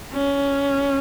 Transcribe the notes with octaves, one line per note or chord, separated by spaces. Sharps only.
C#4